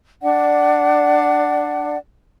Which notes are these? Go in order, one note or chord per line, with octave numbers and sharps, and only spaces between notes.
D4 D5 F#5